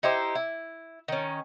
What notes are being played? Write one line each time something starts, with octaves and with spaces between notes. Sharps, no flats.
D#4 E4 G4 C5
E4
D#3 C#4